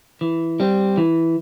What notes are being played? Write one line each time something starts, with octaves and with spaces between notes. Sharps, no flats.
E3
G3 C4
E3